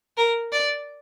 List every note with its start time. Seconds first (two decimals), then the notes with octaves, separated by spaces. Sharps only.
0.18 A#4
0.53 D5